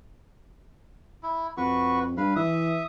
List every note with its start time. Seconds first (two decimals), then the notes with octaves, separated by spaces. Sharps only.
1.23 E4
1.57 F2 F#4 B4 C#6
2.17 G2 B4 F5
2.36 E3 E5 D#6